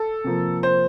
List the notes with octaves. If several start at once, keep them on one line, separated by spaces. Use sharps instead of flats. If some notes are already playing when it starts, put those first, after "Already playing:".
Already playing: A4
C3 F3 A#3
C5